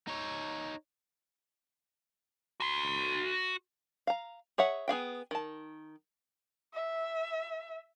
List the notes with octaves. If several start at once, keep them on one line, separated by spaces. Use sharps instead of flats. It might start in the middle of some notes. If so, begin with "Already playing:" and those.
D#4 C#5
F#4 C6
F5 A#5
G#4 C#5 E5 F#5
B3 G#4 F5 G5
D#3 A5
E5